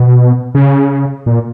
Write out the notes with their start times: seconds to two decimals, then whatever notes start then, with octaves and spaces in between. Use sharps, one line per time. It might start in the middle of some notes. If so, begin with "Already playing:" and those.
Already playing: B2
0.55 C#3
1.26 A#2